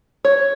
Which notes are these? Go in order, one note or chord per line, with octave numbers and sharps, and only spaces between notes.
C#5